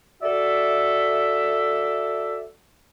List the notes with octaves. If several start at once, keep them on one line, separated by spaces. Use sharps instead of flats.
F#4 A4 D5 E5